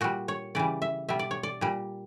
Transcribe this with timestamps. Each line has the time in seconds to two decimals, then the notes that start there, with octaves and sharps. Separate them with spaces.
0.01 A#2 G3 F#4
0.28 C#5
0.55 C#3 E3 G3 D5
0.82 E5
1.09 B2 G3 E5
1.19 D5
1.31 C#5
1.43 D5
1.61 A#2 G3